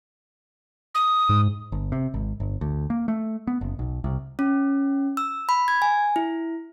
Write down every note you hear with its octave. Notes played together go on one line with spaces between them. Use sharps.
D#6
G#2
G1
C3
G#1
G1
D2
A#3
A3
B3
F#1
B1
C2
C#4
E6
B5
G#6
G#5
E4